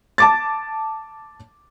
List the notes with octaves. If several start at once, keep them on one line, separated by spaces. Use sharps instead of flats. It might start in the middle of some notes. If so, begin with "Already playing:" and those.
A5 D6 A6